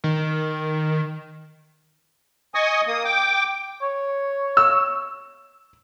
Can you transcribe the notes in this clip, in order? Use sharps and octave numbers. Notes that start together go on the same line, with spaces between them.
D#3
D#5 G#5 C#6 D#6
A#3 D#6
G5 D6
C#5
E6